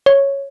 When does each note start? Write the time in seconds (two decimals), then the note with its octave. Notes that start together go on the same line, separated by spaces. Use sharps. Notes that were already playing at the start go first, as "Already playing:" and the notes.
0.06 C#5